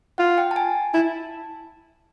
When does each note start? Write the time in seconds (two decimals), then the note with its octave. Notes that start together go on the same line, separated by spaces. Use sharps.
0.18 F4 F#5
0.38 G5
0.51 A5
0.56 G#5
0.94 E4 A5